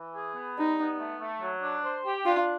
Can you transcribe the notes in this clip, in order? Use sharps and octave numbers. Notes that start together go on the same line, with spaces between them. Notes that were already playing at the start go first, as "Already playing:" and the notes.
Already playing: E3
G#4
B3
G3 D#4
B3
A3
A3
F#3
D4
C5
G4
D4 F4